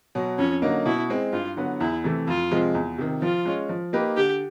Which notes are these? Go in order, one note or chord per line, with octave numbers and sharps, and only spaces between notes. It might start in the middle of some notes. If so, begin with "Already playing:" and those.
B2 F#3
F2 C#4
D3 F#3 A#3 D#4
B2 E4
G#3 C4
G2 F4
D3 F#3 B3
E2 E4
C3 E3 A3
F2 F4
C3 F3 G#3
E2
C3 D#3
F3 F4
G#3 C#4
F3
A#3 D#4 G4 B4
D3 G4